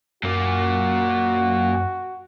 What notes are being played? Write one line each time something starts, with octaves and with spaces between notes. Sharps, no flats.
F#2 A#2 A#3 F#4